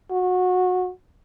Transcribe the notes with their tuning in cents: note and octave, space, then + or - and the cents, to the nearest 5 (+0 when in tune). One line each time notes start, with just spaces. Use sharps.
F#4 -20